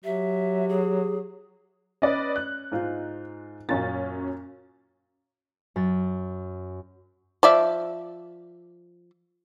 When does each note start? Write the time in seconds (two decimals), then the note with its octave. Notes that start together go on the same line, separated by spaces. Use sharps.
0.04 F#3 G4 E5
0.69 G#4
2.02 C#4 B4 D5 D#5
2.36 F#6
2.72 G#2 D#4 F4
3.69 F#2 A#2 C#4 A6
5.76 F#2 A6
7.43 F3 D5 E5